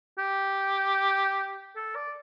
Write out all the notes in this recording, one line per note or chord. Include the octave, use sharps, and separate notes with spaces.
G4
A4
D5